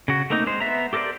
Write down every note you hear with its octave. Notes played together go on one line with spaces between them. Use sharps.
C#3 F#4
A3 A#3 C4 D#4
G#3 C5
B3 E5 A#5
G4 A4 A#4 C5 D5